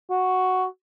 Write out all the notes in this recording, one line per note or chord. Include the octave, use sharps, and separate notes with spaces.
F#4